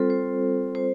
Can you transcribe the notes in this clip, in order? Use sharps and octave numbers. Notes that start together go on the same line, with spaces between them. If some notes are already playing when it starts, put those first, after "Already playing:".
Already playing: G3 C4 F4 A4 C5
C5
C5